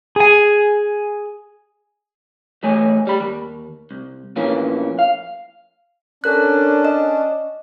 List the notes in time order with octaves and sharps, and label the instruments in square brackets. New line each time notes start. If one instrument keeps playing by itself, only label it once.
[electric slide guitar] G#4 G#5
[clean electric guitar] G2 E3 A3 C#5 G#5
G3 B5
D#2
C2
E2 A#2 E3 F3 A#3 C#4
F5
[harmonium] C#4 D4 [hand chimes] A4 A#4 F#6
[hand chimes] D#5